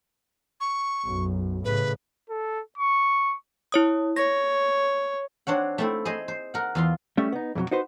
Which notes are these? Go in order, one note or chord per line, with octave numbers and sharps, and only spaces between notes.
C#6
B1 F#2
A2 C#3 B4
A4
C#6
E4 C#5 D#6
C#5 A#6
C4 D4 C#5 F#5
A3 C4 E4
G#4 C5 D#5
C5
A#4 F#5
E2 F4 C6
G3 A3 C#4 E5
B3 D#4
F2 B2 D3 F#3
D#4 F#4 B4 C5